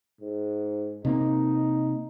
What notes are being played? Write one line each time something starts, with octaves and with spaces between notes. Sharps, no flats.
G#2
C3 A#3 D#4